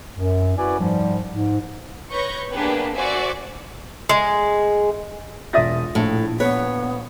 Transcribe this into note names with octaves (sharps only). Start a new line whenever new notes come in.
F#2
C#4 E4 F#4 B4 D5 G#5
G#2 F3 G3
G#2
B4 C#5 C#6 G6 A#6
A#3 B3 D4 G4 G#4 B4
F#4 C5 D5 E5 G#5
G#3
E1 F4 D5 E5 D#6 A#6
A#1 A2
B3 B4 C#5